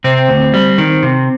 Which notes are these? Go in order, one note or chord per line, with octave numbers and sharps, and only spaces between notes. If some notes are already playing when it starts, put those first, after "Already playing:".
C3 C4
D2
G3
D#3
C3